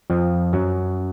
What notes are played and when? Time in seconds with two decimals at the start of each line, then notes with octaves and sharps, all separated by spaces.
0.10 F2 F3
0.53 F#2 F#3